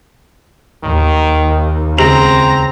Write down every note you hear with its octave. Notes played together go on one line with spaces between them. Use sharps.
D#2 D#3
C#2 C4 G#4 A#5 F7